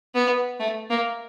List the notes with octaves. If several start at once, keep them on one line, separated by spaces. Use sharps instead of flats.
B3
A3
A#3